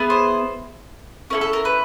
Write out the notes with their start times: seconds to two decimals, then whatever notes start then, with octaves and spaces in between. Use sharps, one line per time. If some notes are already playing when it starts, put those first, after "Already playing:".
Already playing: B3 E4 G#4
0.10 C5
1.30 C#4 E4 A4 A#4
1.41 A4
1.53 A#4
1.65 B4